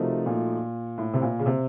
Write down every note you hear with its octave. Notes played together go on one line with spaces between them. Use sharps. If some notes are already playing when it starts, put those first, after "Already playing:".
Already playing: C3 F3 A3 D#4 F#4 A#4
A#2
A2
C3
A#2
C#3
C3